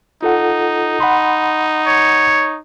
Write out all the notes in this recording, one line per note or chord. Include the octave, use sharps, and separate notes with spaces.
D#4 F4 A4 F#5
F#5 B5 C6
C#5